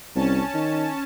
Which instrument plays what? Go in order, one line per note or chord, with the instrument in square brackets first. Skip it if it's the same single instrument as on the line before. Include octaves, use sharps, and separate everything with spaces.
[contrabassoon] C2 [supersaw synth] C#4 A5
[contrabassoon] D#3